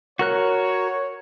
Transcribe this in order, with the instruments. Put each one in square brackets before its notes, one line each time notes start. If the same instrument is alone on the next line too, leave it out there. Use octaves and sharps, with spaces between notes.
[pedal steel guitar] F#4 A#4 F#6 [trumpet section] C#5